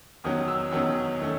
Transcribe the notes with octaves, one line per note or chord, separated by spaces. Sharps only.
E2 D#3 F#3 C#4 D#6
E6
E2 D#3 F#3 C#4 E6
D#3 A3 C#4